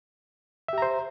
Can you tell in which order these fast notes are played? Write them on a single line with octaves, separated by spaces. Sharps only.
E5 G4 A#5 C5